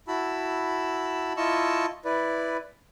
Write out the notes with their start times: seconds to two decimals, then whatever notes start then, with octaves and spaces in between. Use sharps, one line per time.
0.08 E4 F#4 A5 B5 E6
1.37 E4 F4 D#5 A5 C#6 E6
2.05 E4 B4 D5